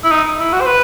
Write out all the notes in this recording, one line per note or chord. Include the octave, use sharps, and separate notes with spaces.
E4
D#4
E4
F#4
C5
B4